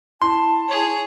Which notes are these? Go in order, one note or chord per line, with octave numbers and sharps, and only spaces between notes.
E4 A5 C6
G#4 C#5